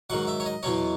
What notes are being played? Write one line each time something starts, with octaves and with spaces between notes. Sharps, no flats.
G#2 D#3 F#3 F#5
E5
C#5
D#5
E2 B2 F#3 C#5